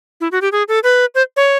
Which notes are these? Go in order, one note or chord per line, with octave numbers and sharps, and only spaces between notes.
E4
F#4
G4
G#4
A4
B4
C5
C#5